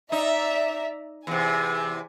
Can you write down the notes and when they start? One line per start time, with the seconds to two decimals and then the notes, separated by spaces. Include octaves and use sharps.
0.12 D#4 D5 E5 A#5
1.27 E2 C3 G#5